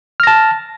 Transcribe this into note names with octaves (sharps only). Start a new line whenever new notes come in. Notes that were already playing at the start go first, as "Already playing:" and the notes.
A5 F6 A#6